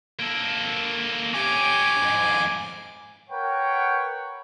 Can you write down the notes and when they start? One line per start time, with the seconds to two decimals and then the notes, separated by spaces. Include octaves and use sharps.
0.19 A#3 A4
1.34 C#4 G4 G#5 D6
2.03 F2 G#2
3.30 A#4 B4 C#5 F#5 G5